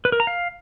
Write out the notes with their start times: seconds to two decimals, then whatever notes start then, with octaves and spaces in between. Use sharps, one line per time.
0.05 B4
0.12 A#4
0.20 A#5
0.27 F5